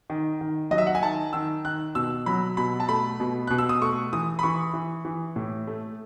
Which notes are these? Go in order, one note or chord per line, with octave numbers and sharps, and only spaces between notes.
D#3
D#3
F#3 D#5
E5
F#5
G#5
D#3 A5
D#3 E6
D#3 F#6
B2 E6
F#3 B5
B2 B5
A5
A3 B5
B2
B2 F#6
E6
D#6
A3 C#6
E3 D#6
B5
E3 C#6
E3
E3
A2
A3